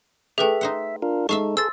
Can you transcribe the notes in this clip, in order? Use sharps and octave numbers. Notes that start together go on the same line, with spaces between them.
A3 G4 G#4 B4 E5 G5
D#4 C5 F#5
D4 F4 A#4
G#3 D#4 A4 E5 F5 A5 C#6
G#4 A4 C5 E6 A6